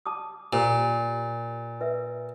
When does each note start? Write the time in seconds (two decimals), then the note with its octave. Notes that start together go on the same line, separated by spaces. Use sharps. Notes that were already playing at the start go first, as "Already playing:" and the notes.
0.06 A5 D6 D#6
0.53 A#2 G4 A#4 C5
1.81 B4 E5